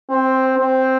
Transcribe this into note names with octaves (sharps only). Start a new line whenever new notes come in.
C4
C4